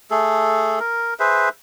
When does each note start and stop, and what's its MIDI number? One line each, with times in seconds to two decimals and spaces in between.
0.11 0.79 57
0.11 0.79 68
0.11 0.79 69
0.80 1.14 70
1.20 1.49 68
1.20 1.49 71
1.20 1.49 72
1.20 1.49 76